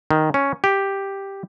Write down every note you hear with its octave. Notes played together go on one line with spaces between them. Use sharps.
D#3
C#4
G4